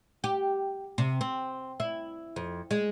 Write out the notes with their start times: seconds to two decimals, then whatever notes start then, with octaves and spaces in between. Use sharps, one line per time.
0.24 G4
0.98 C3
1.21 C4
1.80 E4
2.36 F2
2.71 G#3